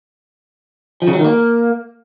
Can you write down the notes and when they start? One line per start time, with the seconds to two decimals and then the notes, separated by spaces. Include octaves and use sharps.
1.02 F3
1.08 C#3
1.13 F#3
1.19 D#3
1.24 A#3